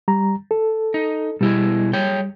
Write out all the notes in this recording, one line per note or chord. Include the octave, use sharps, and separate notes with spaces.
G3 A#5
A4
D#4
B2 G3 E4 G#4
G#4 C#5 G5